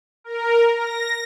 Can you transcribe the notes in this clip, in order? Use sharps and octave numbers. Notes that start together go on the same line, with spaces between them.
A#4
A#6